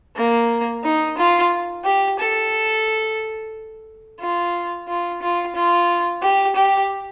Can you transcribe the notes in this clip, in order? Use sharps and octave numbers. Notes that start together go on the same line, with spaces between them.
A#3
D#4
F4
G4
A4
F4
F4
F4
F4
G4
G4